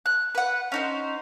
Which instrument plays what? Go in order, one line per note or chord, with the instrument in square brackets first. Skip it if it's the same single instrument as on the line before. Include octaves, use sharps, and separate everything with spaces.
[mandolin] F#6
B4 F#5
C#4 D#4 C5